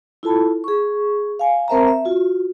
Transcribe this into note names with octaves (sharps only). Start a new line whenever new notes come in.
E4 F4 A4 A5 B5
G#4 C#6
F5 G#5
C4 A#4 C5 E5 A5 A#5
E5
F4 F#4